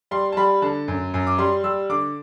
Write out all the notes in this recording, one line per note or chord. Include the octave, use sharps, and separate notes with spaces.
G3 C6
A5
G3 B5
D3 A5
F#2
F#2
D6
G3 C6
G3 E6
D3 D6